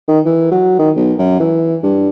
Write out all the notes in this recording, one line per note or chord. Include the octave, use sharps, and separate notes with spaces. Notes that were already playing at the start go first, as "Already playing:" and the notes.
D#3
E3
F#3
D#3
B1
F#2
E3
G2